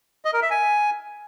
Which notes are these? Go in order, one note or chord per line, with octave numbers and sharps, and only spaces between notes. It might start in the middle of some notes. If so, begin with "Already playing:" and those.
D#5
A#4
E5
G#5